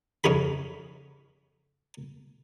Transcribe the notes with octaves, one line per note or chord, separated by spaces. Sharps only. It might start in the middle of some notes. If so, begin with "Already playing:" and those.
F2 C#3 F4 G#4 B5